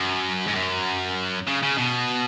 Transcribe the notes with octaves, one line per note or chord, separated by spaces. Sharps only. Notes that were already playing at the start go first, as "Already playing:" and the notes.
Already playing: F#2
G#2
F#2
C#3
C#3
B2